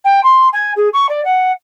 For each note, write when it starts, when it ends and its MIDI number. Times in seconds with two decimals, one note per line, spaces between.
0.04 0.22 79
0.23 0.48 84
0.52 0.72 80
0.76 0.88 68
0.93 1.06 85
1.09 1.23 74
1.24 1.51 78